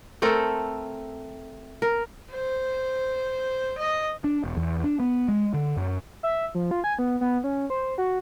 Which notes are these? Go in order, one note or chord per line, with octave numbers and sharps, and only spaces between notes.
A3 C4 A4 A#4
A#4
C5
D#5
D4
E1
E2
D4
B3
G#3
D3
F#2
E5
F3
F4
G#5
B3
B3
C#4
C5
F#4